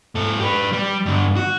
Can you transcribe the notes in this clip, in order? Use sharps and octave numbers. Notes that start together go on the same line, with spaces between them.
G#2 A4
G4 B4
G3
G2 D3
F#4